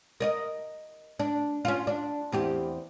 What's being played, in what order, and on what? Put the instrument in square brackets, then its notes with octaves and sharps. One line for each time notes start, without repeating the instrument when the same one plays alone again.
[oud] A#4 D5 D#5
D4
C#4 F4
D4
E2 C4 G4